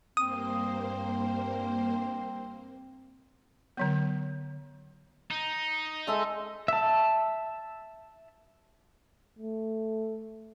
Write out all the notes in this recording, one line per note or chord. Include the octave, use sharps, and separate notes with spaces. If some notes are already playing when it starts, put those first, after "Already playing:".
G2 A#3 C4 C5 D#6
D3 F#3 B3
D#4
G#3 A4 E5
E5 A5
A3